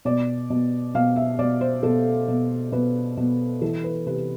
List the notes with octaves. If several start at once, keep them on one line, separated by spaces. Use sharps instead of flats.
B2 D5
B2
B2 F5
E5
B2 D5
C5
B2 A4
B2
B2 B4
B2
E3 A4
B4
C3 B4